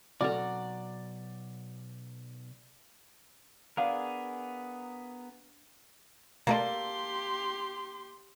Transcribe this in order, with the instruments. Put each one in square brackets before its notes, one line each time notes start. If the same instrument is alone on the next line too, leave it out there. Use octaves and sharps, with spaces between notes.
[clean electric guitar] B1 [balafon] C4 A4 [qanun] F#4 A#5 [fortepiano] D5
[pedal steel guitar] B3 G#4 A#4 [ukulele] D4 F5
[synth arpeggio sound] B2 A3 D5 [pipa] A#3 A4 [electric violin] G4 C6